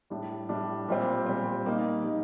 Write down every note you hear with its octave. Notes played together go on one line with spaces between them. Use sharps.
A2 G3 D4
A2 G3 D4
A#2 G3 C4
A#2 G3 C4
G3 A#3 D#4
G3 A#3 D#4